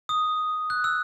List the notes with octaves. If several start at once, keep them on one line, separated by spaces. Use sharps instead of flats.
D#6
F#6
E6